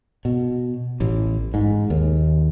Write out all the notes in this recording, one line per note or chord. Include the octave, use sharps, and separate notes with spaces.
B2
A1
G#2
D#2